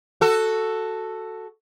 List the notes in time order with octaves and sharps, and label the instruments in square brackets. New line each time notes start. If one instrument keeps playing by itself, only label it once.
[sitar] F#4 A4